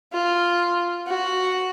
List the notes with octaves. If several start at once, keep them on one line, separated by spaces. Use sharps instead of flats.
F4
F#4